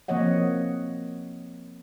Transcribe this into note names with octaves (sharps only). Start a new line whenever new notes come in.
F3 A#3 C4 C#5 D#5 F#5